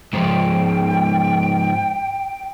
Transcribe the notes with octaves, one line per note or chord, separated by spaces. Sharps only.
G#2 F3 G5